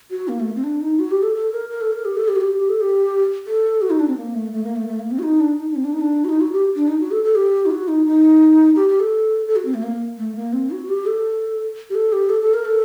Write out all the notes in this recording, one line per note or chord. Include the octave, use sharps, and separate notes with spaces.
F#4
A#3
A3
C4
D4
D#4
F#4
G4
A4
A4
A#4
A#4
A4
A#4
G4
A4
G4
F#4
G4
G4
A4
G4
A4
F#4
D#4
D4
C4
A#3
A3
A3
A#3
A3
A3
A#3
C4
F#4
D#4
D4
D#4
D4
C4
D4
D#4
D4
F#4
D#4
F#4
G4
D4
D#4
F#4
A4
A4
G4
D#4
F#4
D#4
D#4
G4
G4
A4
A4
F#4
C4
A3
A#3
A3
A#3
C4
F#4
G4
A4
G4
A4
G4
A4
A4
A#4
A4